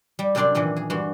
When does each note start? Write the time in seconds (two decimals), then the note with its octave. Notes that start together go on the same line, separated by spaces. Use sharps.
0.19 G3
0.35 F#2 C3 C4 D4 D5 C6
0.55 F#2 A#2 D#3 E3 D4
0.76 G#4
0.90 G2 E3 F#4 C6